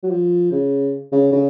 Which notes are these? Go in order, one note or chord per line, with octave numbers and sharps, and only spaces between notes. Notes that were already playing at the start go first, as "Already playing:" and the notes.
F#3
F3
C#3
C#3
C#3